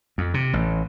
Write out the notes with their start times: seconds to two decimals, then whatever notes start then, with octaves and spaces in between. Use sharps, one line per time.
0.18 F2
0.34 C3
0.53 A1